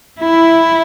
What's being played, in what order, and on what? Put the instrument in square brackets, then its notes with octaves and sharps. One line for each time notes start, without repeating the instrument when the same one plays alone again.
[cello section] E4